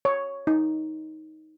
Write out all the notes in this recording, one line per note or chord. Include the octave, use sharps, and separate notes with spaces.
C#5
D#4